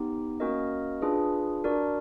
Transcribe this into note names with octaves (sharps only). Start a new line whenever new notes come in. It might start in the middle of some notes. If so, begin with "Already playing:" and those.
Already playing: B3 D#4 G4
A#3 C#4 F#4 A#4 D#5
D4 F4 G#4 B4
D4 F#4 A#4 D5